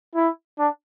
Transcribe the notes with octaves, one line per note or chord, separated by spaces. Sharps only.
E4
D4